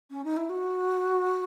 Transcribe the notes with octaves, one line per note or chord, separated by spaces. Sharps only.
C#4
D#4
E4
F#4